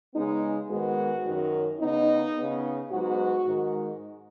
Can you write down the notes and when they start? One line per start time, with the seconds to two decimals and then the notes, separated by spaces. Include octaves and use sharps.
0.14 C#3 G#3 B3 D#4
0.70 G#2 D#3 G#3 B3 F#4
1.26 F#2 D#3 F#3
1.80 C#3 B3 D#4
2.36 C#3 B3
2.91 G#2 F#3 B3 F#4
3.47 G#2 D#3 G#3